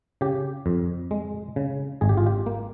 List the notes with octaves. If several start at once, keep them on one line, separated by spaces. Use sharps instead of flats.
C#3 G4
F2
G#3
C#3
G#1 G#4
G4
F4
G4
A#3